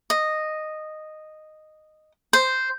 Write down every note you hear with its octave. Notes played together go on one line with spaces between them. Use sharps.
D#5
C5